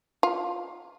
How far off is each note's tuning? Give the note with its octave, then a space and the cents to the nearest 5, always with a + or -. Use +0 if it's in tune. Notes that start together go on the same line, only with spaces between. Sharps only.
F4 +15